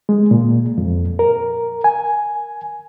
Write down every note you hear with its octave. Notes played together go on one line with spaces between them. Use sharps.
G#3
A#2
F2
A#4
G#5